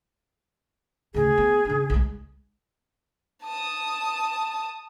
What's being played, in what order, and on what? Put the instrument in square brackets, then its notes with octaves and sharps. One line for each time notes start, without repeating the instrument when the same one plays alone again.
[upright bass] D2 C#3 [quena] G#4
[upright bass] B3
C#3 D4
B1 G#3
[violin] A5 D#6